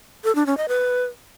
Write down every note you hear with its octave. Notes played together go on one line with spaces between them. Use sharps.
A4
D4
C#4
D#5
B4